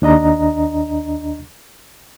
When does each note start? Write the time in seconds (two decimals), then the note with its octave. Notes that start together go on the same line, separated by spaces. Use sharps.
0.02 D#2 D4 D#5 A#5